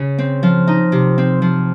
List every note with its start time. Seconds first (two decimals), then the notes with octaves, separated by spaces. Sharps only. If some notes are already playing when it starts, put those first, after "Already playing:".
Already playing: C#3
0.18 C4
0.43 F3
0.67 D#4
0.92 C3
1.18 C4
1.42 F3